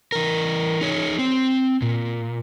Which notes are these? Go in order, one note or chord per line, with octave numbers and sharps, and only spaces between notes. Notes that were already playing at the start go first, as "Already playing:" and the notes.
E3 A#4
D#4 G#4 C#5
C4
A#2